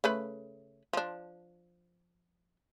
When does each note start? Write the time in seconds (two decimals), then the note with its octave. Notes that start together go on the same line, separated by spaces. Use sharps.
0.04 C#3 A3 B4
0.93 F3 D4